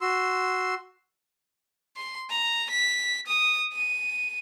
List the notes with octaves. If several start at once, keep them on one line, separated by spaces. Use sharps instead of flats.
F#4 C6 E6
C6
A#5
B6
D#6
D#7